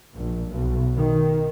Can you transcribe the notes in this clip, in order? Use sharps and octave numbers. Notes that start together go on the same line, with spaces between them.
A#1
B1
D#3